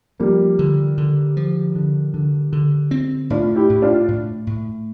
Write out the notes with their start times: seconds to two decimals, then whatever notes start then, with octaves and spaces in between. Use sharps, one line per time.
0.20 F3 G3 A#3
0.59 D3
0.98 D3
1.37 F3
1.76 D3
2.14 D3
2.53 D3
2.91 C4
3.30 A2 D4 F4
3.56 E4 G4
3.70 A2
3.82 D4 F4
4.08 A2
4.47 A2